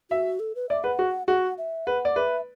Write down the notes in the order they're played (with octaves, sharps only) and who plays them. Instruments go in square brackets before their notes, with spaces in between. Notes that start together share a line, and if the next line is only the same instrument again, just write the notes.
[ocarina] F#4 [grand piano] E5
[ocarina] A4
B4
[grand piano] D5 [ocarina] E5
[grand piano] B4 [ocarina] F#5
[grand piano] F#4
[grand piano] F#4 [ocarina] F#5
[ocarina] E5
[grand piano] B4 [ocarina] F#5
[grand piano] D5
[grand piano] B4 [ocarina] E5